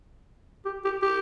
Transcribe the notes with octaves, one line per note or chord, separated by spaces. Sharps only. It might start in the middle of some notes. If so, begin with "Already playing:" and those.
G4
G4
G4